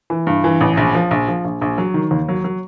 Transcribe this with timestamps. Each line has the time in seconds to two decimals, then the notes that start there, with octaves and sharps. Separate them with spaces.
0.10 E3
0.27 G2
0.44 E3
0.61 A1
0.77 A#1
0.95 F3
1.11 A#1
1.28 F3
1.44 A#1
1.61 A#1
1.78 F#3
1.94 D#3
2.11 D#2
2.29 F#3
2.44 F#3